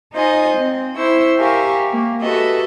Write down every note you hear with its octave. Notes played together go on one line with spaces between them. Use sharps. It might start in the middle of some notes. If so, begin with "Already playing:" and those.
D#4 F4 C5 D#5 G#5
C4
E4 C5 C#6 E6
G4 A#4 E5 F5 G#5 C#6
A#3
F#4 G4 A4 B4 D#5 E5